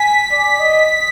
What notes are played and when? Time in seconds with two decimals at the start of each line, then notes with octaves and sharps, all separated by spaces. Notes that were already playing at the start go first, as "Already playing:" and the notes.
Already playing: G#5 B6
0.32 D5
0.60 D#5